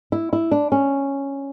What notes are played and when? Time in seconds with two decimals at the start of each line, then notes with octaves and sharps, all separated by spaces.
0.12 E4
0.33 E4
0.51 D4
0.72 C#4